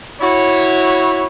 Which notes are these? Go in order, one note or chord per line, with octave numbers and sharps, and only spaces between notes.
E4 F#4 C#5